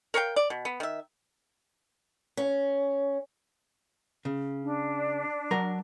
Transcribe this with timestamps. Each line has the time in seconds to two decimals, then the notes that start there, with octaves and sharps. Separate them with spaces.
0.14 A#4 C#5 F5 G5
0.36 D5
0.50 B2
0.65 B3
0.80 D#3 E5
2.37 C#4
4.25 C#3
4.62 D4
5.51 F#3 A#4 A#5